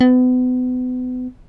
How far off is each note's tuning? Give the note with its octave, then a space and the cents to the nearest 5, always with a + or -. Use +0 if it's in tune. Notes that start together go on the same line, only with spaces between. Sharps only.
B3 +35